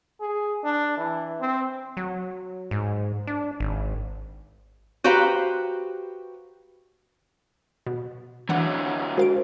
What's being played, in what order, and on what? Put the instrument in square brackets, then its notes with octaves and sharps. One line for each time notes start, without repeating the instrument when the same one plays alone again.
[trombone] G#4
D4
E3
C4
[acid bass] F#3
G#2
D4
G#1
[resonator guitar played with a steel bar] F#4 G4 B4 C5 F5 A#5
[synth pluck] B2
[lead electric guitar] D3 F#3 [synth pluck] E3 F#5
[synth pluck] G#3 F5 D7 [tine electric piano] F#4 A#4 C5